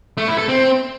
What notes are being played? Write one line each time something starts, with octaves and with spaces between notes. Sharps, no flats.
A3
E4
A4
C4